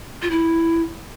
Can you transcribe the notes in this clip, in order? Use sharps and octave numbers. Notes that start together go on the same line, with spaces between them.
F4
E4